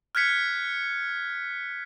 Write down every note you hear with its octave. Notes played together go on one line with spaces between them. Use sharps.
F6 F#6 G#6 B6 C#7